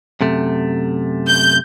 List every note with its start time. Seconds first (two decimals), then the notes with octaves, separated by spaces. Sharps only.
0.21 F#2 C3 A3
1.28 G6